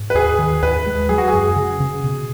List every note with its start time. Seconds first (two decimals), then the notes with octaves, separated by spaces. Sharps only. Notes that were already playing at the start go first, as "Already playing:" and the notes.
Already playing: G#2
0.10 B4
0.15 D#2 G#4
0.38 D#3
0.63 D#2 B4
0.86 G#3
1.09 F#3 G#4
1.18 F#4
1.28 G#4
1.33 F#2
1.56 C#3
1.80 C#3
2.04 B2